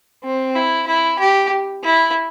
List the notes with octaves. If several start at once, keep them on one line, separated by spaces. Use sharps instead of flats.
C4
E4
E4
G4
E4